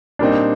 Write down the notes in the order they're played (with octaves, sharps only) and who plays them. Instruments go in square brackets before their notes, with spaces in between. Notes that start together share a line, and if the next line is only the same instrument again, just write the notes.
[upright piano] A#2 G3 C4 D#4 [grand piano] A#3 D4